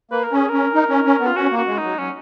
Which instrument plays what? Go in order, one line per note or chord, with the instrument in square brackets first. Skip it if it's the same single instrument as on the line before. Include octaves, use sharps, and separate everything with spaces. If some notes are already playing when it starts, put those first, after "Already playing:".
[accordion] A#3 [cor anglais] B4
[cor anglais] A#4
[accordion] C#4 [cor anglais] G#4
[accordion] C#4 [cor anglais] A#4
[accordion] D#4
C#4
C#4
B3
[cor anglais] F4
[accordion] C#4 [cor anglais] F#4
[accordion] A#3
[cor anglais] F#4
[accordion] G#3
[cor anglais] D#4
[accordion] F#3
[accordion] F#3 [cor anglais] C#4